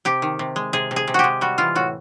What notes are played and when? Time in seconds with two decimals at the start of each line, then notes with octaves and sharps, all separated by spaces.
0.05 C3 G4
0.22 D#3
0.39 C3
0.56 G#3
0.73 C3 G#4
0.91 C3
0.96 G#4
1.08 C3
1.14 F#4 G4
1.24 G#3
1.41 G3 F#4
1.58 E3 F4
1.75 A2 F#4